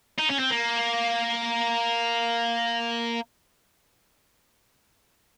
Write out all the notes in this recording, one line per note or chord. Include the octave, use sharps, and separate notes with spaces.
D#4
C#4
C4
A#3